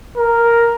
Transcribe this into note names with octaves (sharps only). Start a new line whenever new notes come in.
A#4